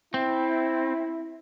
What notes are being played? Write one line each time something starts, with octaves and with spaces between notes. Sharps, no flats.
C4 E4